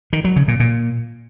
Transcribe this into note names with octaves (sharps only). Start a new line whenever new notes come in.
D#3
F#3
C#3
A#2
A#2